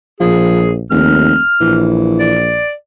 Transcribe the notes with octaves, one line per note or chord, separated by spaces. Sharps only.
A#1 F3 G#4
F1 D#2 F6
A#1 E3
D5